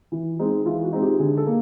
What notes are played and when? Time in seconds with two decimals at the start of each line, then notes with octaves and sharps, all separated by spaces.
0.12 E3
0.39 G#3 C4 D#4
0.65 E3 F4
0.83 F#4
0.93 G#3 C4 D#4
1.02 G4
1.19 D3 G#4
1.37 A4
1.46 A#3